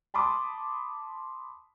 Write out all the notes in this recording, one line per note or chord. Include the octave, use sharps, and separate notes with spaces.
A5 B5 C6 D6 D#6